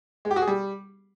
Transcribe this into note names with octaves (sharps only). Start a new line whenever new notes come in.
G#3
G4
F#4
G#4
G3